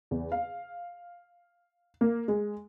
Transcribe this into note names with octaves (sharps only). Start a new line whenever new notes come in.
E2
F5
A#3
G#3